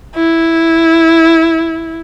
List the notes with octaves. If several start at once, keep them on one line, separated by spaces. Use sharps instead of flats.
E4